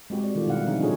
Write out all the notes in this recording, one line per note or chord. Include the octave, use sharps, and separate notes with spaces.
G#3 C4 F#4 G4
D5
D#3 G3 F4 A4
B2 E4 F5 F#5
D3 F3 C4 D#4 G#4
D4 F4 F#4 G#4 A4 C#5